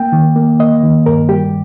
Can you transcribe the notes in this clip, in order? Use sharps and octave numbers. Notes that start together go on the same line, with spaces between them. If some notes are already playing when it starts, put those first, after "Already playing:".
Already playing: A#3 G5
D#3
A#3
A#3 D#5
D#3
G2 A#4
G3 G4